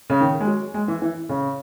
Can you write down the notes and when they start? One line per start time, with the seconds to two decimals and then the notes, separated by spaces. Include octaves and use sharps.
0.10 C#3
0.21 D#3
0.40 G#3
0.47 F#3
0.74 G#3
0.88 E3
1.02 E3
1.29 C#3